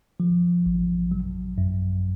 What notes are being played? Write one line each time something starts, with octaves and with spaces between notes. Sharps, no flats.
F3
A1
F#3
F#2